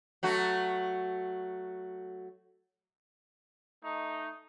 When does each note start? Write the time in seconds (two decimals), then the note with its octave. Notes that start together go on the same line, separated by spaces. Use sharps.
0.23 F#3 A3 F#4
3.83 A3 D#4